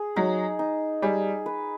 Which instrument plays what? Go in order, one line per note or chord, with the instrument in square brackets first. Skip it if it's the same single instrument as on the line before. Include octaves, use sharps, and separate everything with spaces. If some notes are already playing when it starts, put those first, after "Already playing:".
Already playing: [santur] G#4
[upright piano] F#3 [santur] D#4
[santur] D#4
[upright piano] G3 [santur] G#4
[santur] B4